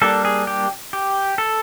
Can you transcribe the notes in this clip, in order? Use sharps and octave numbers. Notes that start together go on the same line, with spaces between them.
G3 A#3 D4 A4
G#4
G4
G4
A4